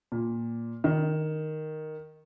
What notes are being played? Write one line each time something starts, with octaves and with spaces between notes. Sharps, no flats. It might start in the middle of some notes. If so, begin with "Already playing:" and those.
A#2
D#3